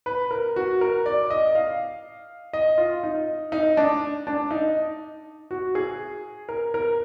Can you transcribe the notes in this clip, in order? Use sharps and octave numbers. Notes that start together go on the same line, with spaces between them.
B4
A#4
F#4
A#4
D5
D#5
F5
D#5
F4
D#4
D#4
D4
D4
D#4
F#4
G#4
A#4
A#4